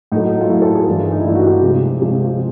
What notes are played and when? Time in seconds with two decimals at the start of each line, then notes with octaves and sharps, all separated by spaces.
0.12 A2 F#3 A3 D#4
0.41 F4
0.49 A2 F#3 A3 E4
0.62 A4
0.75 G#4
0.87 G2 E3 A3
1.12 D#4
1.20 E4
1.24 G2 E3 A3 F4
1.35 F#4
1.43 G4
1.61 C3 F3 G#3
1.99 C3 F3 G#3
2.25 F4